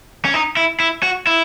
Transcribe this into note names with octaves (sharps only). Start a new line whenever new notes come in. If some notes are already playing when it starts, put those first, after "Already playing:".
C#4
D#4
E4
E4
F#4
E4